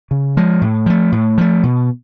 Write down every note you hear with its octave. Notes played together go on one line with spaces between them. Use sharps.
C#3
F3 G#3
A2
F3 A3
A2
F3 A3
B2